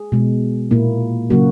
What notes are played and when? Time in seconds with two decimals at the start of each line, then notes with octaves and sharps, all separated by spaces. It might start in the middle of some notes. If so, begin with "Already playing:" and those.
Already playing: G#4
0.12 B2 G#3
0.71 A#2 A#3 E4
1.30 C#3 F#3 A#3 F#4